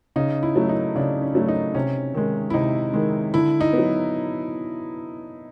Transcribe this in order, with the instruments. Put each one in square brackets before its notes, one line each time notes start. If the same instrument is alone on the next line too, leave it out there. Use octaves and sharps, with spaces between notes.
[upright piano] C#3 [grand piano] D#4
[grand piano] E4
[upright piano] F#3 A3
[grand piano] D#4
[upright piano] C#3 [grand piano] D4
[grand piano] C#4
[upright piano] F#3 A3
[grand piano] D#4
[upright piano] C3 [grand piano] C#4
[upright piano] D#3 G#3
[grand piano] E4
[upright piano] C3 [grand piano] D#4
[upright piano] D#3 G#3
[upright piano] D3 [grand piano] E4
[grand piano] D#4
[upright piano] F#3 B3